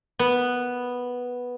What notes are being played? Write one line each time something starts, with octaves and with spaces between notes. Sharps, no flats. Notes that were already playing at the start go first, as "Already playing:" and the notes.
B3